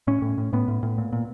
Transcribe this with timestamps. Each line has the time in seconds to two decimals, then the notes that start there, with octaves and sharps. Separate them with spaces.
0.07 A2 C#4
0.22 A2
0.38 A2
0.53 A2 B3
0.68 A2
0.83 A2
0.98 A#2
1.13 A#2